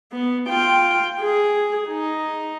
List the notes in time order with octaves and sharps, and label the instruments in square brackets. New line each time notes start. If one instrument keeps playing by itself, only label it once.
[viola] B3
F4 G5
G#4
D#4